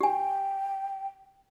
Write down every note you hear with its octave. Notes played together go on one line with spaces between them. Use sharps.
G4 G5 G#5